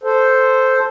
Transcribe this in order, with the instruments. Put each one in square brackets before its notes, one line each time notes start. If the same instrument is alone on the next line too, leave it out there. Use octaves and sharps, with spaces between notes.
[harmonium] A4 C5